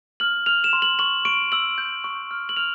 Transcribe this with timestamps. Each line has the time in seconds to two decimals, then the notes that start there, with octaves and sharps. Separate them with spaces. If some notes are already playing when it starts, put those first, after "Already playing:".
0.20 F6 F#7
0.46 F6 F7
0.64 E7
0.73 C6
0.82 F#7
0.99 C#6 F#7
1.25 C#6 D7
1.52 E6 F#7
1.78 G6
2.04 C#6
2.31 F6
2.49 F#7
2.57 F6 F7